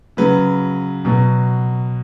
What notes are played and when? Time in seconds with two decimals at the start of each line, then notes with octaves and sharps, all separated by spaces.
0.17 C#3 F#3 B4
1.05 B2 F#3